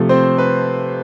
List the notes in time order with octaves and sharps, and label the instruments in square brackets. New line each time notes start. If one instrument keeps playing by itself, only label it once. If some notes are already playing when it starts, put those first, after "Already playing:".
Already playing: [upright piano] C3 F3 A3
[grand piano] C4 C5
B4